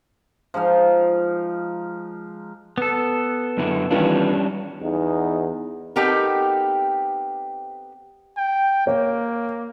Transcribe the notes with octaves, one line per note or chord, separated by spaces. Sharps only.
F3 G#3 D#4 F5
B3 A4
F#2 D3 E4
D#3 E3 G3 C#4 D4 F4
E2 B3 D#4
B3 C4 D#4 G4 A4 A#4
G5
A#3 C#5